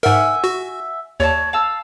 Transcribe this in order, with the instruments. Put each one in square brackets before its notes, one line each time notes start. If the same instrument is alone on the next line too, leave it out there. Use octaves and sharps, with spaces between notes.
[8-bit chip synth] G#2 A#4 [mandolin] E5 F#5 G#5
[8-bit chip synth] F#4
[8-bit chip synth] D#2 [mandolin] C#5 D5 A5
[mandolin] F5 A5 E6